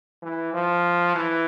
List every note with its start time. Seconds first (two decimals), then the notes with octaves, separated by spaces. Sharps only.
0.23 E3
0.54 F3
1.15 E3